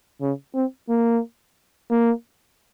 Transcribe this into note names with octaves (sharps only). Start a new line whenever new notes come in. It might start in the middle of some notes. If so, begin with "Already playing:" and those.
C#3
C4
A#3
A#3